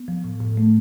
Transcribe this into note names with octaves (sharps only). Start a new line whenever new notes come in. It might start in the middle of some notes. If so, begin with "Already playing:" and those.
Already playing: B3
F3
A2
A2
A3